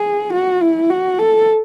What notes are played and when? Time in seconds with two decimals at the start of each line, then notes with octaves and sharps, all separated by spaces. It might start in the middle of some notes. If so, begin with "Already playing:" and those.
Already playing: G#4
0.33 F#4
0.62 E4
0.90 F#4
1.19 A4